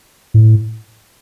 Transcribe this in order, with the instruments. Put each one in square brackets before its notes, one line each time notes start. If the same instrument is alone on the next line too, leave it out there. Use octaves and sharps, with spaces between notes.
[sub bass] A2